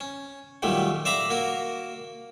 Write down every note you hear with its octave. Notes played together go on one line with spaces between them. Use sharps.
C#4
A#2 D#3 F#3 G3 A3
D5 E5 F5 A#5 B5 D6
A#3 F#4 A#4